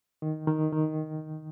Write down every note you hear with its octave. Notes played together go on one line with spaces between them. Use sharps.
D#3
D#3
D#3